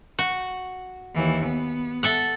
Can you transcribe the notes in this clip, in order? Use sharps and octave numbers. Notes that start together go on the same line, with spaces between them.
F#4
D#2 E3
B3
A4 E5 F#5